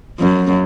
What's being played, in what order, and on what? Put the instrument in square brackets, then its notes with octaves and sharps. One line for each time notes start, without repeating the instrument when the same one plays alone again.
[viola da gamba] F#2